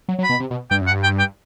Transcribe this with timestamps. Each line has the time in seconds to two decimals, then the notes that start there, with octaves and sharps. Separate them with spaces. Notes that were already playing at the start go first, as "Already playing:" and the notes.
0.08 F#3
0.19 F#3
0.23 B5
0.29 B2
0.40 C3
0.51 B2
0.71 G2 G5
0.81 F#2
0.87 F#5
0.91 G2
1.03 G5
1.19 G5